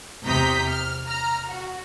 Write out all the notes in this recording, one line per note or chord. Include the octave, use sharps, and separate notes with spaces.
E2 C3 A#5 D#6 G6 B6
F6
A#5 F6
F#4